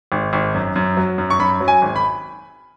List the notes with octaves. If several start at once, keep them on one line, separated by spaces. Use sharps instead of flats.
G#1
G#1
F#2
F#2
F#3
F#2
C#6
F#2 B5
F#3
G#5
G#1
B5